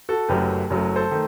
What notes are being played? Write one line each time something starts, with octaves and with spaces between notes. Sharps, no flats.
F#4 A4
F#1 F#2 F#3 A3 G4 B4
F#1 F#2 F#3 A3
A4 C5
D#3 A3